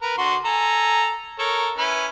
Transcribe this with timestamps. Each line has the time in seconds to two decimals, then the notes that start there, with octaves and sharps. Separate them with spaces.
0.02 A#4 B4
0.18 D3 F#4 C6
0.45 A4 G#5 A#5
1.39 A4 A#4 C#5
1.78 C#4 E4 B4